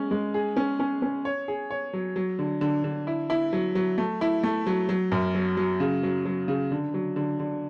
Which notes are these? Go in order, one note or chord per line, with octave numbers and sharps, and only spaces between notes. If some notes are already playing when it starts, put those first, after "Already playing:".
Already playing: G#3 C#4
G#3
G#4
C#4
C#4
C#4
C#5
G#4
C#5
F#3
F#3
D3
D3
D3
E4
E4
F#3
F#3
A3
E4
A3
F#3
F#3
F#2
F#3
F#3
C#3
F#3
F#3
C#3
D3
F#3
D3
D3